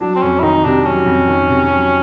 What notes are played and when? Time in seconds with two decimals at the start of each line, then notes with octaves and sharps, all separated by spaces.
0.01 F#3 D4
0.15 C4
0.22 F2 C#4
0.39 E4
0.43 D#3 D#4
0.64 C3 D4
0.86 F#3 C#4
1.06 F2
1.28 D#3
1.49 C3
1.69 F#3